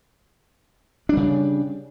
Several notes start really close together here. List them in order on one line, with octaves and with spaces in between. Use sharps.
D4 G3 C#3